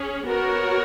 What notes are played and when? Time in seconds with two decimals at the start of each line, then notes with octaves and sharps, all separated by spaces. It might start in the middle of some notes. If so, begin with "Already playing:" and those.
Already playing: C#4 G#4
0.26 B3 F#4 A#4 C#5